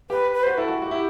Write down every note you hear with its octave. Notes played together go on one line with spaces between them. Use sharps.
G4 B4
B4
C5
F#4 B4
E4 A4
F#4
F#4 G4
E4